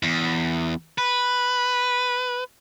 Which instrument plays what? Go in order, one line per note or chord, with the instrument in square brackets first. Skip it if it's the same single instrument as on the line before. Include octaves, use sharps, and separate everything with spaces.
[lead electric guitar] E2
B4